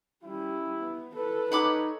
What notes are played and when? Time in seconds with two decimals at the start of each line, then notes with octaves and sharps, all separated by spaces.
0.23 G3 C#4 E4
0.78 B3
1.16 E4 A4 B4
1.52 D#4 A4 C#5 F#5 B5 D6